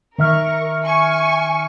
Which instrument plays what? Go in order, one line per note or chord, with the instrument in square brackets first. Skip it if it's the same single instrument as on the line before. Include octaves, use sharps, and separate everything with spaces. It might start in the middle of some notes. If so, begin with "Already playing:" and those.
[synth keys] D#3 E5 F6 [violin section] A#4 C#6
[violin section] G#5 C#6